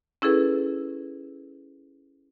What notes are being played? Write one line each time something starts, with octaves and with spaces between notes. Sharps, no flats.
C#4 E4 G#4 A4 B4